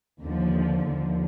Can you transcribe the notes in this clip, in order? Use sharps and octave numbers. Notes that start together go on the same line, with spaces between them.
D#2 D3 F3
D#2 D3 F3